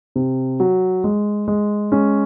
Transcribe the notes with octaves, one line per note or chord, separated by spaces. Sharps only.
C3
F#3
G#3
G#3
G#3 C#4